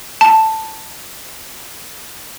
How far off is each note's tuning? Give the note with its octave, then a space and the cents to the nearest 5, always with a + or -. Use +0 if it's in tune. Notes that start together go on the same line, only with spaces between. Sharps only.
A5 +5